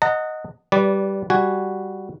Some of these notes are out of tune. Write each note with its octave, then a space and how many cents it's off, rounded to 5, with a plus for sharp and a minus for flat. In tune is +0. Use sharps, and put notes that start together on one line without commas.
D#5 +0 F#5 +0 A#5 -40
G3 -5 B4 +0 D5 -25
G3 +0 F#4 +0 G#5 +0